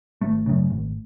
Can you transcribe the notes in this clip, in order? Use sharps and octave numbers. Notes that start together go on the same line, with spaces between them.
G#1 A3
F#2 C#3
G#1